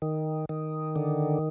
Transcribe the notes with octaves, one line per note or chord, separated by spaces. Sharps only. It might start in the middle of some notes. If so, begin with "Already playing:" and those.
D#3
D#3
D3